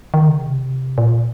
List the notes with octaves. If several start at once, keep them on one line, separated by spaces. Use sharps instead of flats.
D#3
C#3
C3
A#2